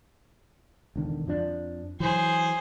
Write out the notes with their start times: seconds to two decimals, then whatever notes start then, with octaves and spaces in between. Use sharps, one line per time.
0.96 E1 D3 D#3
1.27 F2 F3 D4
2.00 E3 F#3 G#4 C5